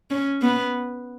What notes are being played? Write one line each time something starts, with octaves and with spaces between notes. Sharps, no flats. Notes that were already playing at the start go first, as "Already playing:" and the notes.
C#4
B3